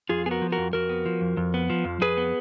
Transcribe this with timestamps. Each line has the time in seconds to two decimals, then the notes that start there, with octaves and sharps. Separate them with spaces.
0.09 F2 F4 G#4
0.26 B3 G#4
0.31 F#4 A#4
0.42 F3
0.52 F#4 A#4
0.58 F2
0.73 F2 F#4 A#4
0.89 B3
1.06 F3
1.21 F2
1.37 F2
1.54 B3
1.70 F3
1.85 F2
2.01 F2 G#4 B4
2.17 B3